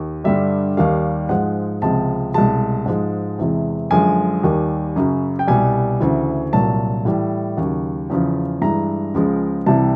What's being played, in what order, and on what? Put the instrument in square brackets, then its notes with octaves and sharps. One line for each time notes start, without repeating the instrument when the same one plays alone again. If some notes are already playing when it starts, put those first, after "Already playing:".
Already playing: [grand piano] D#2
G2 D3 G3 E5
D#2 D#3 G3 F5
G#2 F3 G#3 F#5
C#2 C3 F3 G#3 A5
C2 B2 G#3 A5
G#2 F3 G#3
E2 C3 E3 G#3
F#2 D3 F3 G#3 G#5
D#2 D#3 G3
F#2 C#3 F#3
G5
C2 B2 G3 G#5
D2 C#3 E3
C2 A#2 F#3 A5
A2 E3 G3
D#2 C#3 F#3
E2 C#3 F3
G2 E3 G#3 A#5
C#2 C#3 F3 G#3
C2 C3 E3 G3 A5